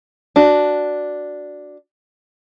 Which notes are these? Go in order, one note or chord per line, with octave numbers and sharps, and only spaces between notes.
D4 F#4